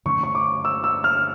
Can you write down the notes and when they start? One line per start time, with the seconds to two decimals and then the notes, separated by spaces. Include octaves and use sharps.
0.05 G2 D3 A3 C#4 C#6
0.23 C#6
0.35 D6
0.65 E6
0.84 E6
1.04 F6